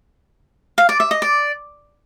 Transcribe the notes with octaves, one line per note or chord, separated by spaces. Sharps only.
F5
D5
E5
D#5
D5